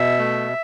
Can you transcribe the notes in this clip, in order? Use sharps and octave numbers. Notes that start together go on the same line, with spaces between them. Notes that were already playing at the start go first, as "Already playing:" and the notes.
Already playing: B2 E5
A3